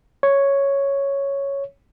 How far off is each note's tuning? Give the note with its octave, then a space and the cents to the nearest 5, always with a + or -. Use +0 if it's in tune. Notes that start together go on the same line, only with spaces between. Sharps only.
C#5 +0